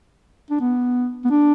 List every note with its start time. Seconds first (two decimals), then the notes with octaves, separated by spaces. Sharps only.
0.50 D4
0.61 B3
1.25 B3
1.31 D4